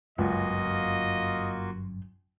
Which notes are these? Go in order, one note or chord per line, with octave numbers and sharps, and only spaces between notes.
G1 C#2 F#2 A#3 F4 F#4 D#5